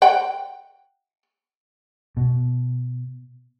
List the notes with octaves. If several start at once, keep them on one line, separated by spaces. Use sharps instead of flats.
F#5 G5
B2